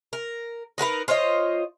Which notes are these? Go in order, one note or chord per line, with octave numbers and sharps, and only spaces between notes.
A#4
D#4 F#4 A#4 B4
F4 C5 C#5 D#5